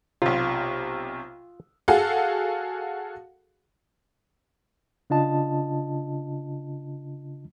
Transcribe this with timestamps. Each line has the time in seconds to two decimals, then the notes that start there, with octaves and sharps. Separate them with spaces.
0.22 B1 C3 F4
1.88 F#4 G#4 A4 F5 F#5
5.10 C#3 D4 F4 D#5 A5